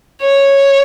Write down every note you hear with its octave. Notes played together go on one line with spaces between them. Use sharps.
C#5